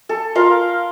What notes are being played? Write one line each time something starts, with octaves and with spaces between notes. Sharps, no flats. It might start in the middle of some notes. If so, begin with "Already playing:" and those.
A4
F4 A#4 F5 C6